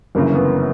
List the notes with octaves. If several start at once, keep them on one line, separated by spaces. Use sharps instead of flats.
G1 F#2 C#3 E3 A#3
B3